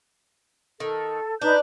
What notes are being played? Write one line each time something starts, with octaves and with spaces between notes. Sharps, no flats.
D#3 A4
D4 D#4 B4 G6